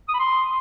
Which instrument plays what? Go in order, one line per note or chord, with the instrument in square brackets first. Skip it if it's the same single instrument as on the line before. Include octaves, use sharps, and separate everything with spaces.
[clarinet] D#6
B5
C6